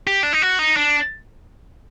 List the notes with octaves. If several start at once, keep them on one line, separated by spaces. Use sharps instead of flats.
G4
D4
D#4
F#4
D#4
D4